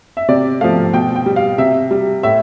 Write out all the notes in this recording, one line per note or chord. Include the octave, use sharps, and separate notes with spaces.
E5
C3 D5
F3 A3 F5
B2 G5
G5
G3
F5
C3 E5
G3
A2 E5